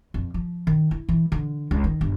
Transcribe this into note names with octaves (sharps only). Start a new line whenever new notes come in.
F2
F3
D#3
E4
E3
D3
C#2
D#3
G1